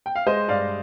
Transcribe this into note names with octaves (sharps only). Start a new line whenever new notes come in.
G5
F5
G#3 C5 D#5
G2 D5 F5